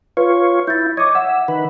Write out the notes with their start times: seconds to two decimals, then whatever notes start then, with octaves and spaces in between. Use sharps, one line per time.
0.17 F4 B4 C#5
0.67 E4 G6 A6
0.97 C#5 D#5 D6 G#6
1.15 E5 F#5
1.48 D#3 B4